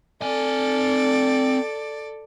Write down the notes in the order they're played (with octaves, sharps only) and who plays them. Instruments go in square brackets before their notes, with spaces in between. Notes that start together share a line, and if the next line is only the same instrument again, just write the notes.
[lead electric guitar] C4 G#5 [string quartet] A4 D5